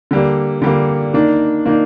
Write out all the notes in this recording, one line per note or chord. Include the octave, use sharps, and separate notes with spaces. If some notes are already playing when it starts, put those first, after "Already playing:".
D3 G3 A#3
D3 G3 A#3
D#3 A#3 D4
D#3 A#3 D4